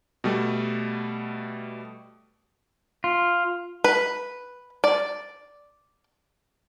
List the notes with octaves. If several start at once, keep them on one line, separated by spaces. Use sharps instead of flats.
B2 G3 A3
F4
B4
D5